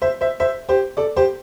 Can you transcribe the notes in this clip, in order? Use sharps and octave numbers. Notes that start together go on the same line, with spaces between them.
C5 E5
C5 E5
C5 E5
G4 C5
A4 D5
G4 C5